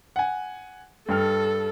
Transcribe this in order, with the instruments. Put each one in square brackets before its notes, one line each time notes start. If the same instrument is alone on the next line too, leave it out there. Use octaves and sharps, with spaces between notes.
[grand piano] F#5 G#5
[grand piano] G2 G5 F6 [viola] A4